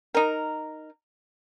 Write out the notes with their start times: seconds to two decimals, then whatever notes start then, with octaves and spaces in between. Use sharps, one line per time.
0.14 D#4 A#4